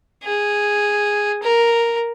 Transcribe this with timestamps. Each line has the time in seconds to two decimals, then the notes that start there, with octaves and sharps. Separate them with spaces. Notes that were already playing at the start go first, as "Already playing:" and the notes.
0.24 G#4
1.43 A#4